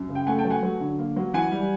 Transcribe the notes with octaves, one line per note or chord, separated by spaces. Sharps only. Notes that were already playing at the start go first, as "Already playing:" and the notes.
Already playing: F#2
C#3
G5
A3 F#5 G#5
G5 A5
F#3
F#5 G#5
F#3
D3
A#3
F#3
E3 F#5 G#5
G3